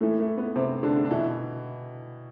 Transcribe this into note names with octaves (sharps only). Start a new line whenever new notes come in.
A2 E3 A3
A3
B3
C3 C4
D3 D4
D4
B2 E3 E4